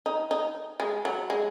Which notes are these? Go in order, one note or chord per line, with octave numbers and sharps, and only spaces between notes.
D#4
D#4
G#3
F#3
G#3